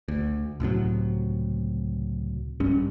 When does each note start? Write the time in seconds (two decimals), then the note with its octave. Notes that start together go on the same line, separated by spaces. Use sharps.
0.08 D2
0.60 C#2 A2 C3 F#3
2.60 C2 G#2 G3 C#4